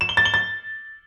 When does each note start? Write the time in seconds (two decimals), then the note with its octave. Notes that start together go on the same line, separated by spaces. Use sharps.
0.01 E7
0.09 G7
0.17 A6
0.25 G7
0.34 A6